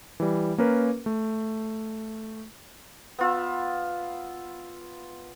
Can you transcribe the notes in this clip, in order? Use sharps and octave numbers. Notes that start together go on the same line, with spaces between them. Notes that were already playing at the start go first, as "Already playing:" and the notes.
E3 G3
A#3 C#4 A#4 B4
A3
B3 F4 E5